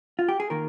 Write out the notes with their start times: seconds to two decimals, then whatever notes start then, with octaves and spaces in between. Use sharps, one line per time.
0.19 F4
0.29 G4
0.40 G#4
0.50 D#3 A#3 A#4